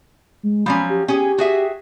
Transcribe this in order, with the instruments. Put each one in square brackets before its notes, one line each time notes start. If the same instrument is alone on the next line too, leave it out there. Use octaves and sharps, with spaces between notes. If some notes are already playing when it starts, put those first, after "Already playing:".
[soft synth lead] G#3
[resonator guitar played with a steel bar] F3 F#3 C#4 [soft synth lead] B5
[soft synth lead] G4
[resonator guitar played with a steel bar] C#4 G#4 [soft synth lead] G4
[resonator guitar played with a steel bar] F#4 G#4 E5